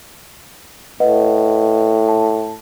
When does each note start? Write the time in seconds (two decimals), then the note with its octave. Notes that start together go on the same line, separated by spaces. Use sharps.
1.00 A2 B4 D#5 F#5
2.09 A5